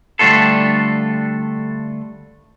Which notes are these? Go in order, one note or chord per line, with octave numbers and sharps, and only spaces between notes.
D3 G3 A3 D4 F4 A4